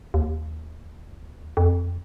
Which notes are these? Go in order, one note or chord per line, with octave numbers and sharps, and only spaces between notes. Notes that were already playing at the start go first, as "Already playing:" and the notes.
D#2
F2